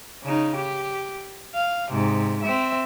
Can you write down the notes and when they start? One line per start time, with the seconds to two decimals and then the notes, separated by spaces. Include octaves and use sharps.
0.23 C#3 D#4
0.56 G4
1.55 F5
1.91 G#2 C3
2.43 C4 E5